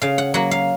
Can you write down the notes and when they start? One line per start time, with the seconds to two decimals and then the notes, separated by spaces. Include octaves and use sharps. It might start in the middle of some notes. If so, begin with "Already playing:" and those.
0.02 C#3 F5
0.18 F#5
0.34 F#3 A#3 F#5
0.51 F5